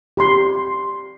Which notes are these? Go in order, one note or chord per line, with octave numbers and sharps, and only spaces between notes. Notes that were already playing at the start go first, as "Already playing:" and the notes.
G4 B5 C6